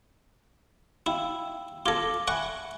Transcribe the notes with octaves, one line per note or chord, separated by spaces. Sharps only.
E4 F5 G5 E6
F4 A4 D6 G#6 A#6
E5 F#5 G#5 B5 C#6